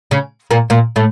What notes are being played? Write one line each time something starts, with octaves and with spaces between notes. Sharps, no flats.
C#3 C#4
A#2 A#3
A#2 A#3
A2 A3